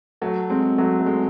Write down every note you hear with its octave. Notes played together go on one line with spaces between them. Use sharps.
F#3 A3
G#3 C4
F#3 A3
A3
G#3 C4